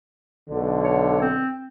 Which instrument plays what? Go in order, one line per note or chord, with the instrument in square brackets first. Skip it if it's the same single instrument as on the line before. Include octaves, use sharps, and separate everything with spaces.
[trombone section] B1 D3
[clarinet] C#5
C4